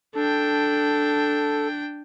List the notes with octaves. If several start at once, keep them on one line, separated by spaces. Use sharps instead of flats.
D4 A4 G5